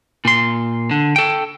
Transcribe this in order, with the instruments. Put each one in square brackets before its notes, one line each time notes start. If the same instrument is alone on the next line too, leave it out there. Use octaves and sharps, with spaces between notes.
[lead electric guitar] A#2 C6
D3
A4 G5